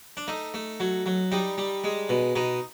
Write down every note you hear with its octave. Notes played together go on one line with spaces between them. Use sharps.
D4
A3 D#4
A3
F#3
F#3
G3 D#4
G3
G#3
B2
B2 D#4